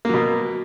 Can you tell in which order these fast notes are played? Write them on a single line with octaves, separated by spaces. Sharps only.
A#3 F#3 B2